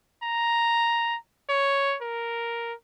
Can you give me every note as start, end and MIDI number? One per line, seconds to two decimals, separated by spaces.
0.23 1.16 82
1.49 1.96 73
2.01 2.73 70